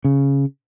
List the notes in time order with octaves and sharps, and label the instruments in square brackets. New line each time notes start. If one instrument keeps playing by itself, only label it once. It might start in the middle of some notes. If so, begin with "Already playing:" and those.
[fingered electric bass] C#3